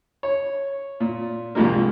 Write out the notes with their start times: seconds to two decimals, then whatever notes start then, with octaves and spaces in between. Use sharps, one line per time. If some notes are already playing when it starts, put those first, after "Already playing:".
0.23 C#5
1.00 A#2
1.55 C2 G#2 F3 G#3 A#3